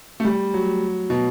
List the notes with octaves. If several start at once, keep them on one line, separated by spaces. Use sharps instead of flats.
A3
G3
F#3
B2